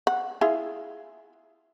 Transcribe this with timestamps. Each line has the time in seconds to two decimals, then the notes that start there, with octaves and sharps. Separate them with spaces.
0.07 F#5
0.41 E4 F4 G#4